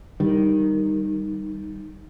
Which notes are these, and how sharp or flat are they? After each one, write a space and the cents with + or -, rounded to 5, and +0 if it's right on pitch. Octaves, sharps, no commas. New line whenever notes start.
D#3 -5 G3 +0